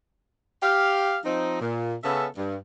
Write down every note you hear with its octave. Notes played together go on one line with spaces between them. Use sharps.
G4 F5
F3 C4 D#4
A#2
C#3 B3 C#4 A4 E5
G2